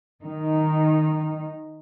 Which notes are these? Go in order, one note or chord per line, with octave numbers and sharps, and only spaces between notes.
D#3 D#4